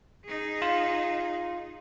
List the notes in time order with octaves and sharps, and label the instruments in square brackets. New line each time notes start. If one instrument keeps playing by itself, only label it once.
[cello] D#4 G#4
[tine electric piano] F4